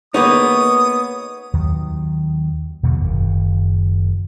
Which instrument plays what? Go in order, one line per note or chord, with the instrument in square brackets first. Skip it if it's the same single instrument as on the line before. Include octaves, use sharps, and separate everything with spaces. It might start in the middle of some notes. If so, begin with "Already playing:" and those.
[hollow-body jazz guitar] A#3 B3 D#4 [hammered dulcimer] C#5 [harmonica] D#6
[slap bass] D#2 D#3 F#3
E2 B2 D3 F#3
F#1 D#3